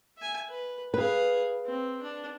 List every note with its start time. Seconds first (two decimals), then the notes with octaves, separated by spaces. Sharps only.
0.17 E5 G#5
0.49 B4
0.94 G#4 B4 F5
1.65 C4
2.02 D4